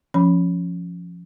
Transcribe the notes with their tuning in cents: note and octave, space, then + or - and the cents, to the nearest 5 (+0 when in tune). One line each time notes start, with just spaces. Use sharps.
F3 +0 C#4 +0 B5 +0